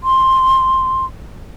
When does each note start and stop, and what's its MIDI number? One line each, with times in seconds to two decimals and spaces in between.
0.04 1.05 84